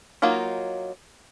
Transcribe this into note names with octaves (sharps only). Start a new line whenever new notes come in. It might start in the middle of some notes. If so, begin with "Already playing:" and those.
F#3 A#3 D#4 F4 A#4